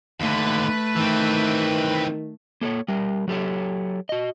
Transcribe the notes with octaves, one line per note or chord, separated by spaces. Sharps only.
D#2 D3 A3 B4 B5
D#3 E3 C4
A#3 A4 C5 C#5
G3 A#4
F#3 G4 A4 C#5
F#4 D#5